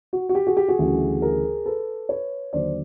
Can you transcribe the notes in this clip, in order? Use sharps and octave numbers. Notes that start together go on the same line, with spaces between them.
F#4
F#4
G4
F#4 G#4
G4
F#4 G#4
D2 C#3 E3 G3
G#4 A#4
A4 B4
B4 C#5
D#2 D3 F#3 C5 D5